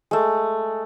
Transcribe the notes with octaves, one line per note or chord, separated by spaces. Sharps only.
G#3 A3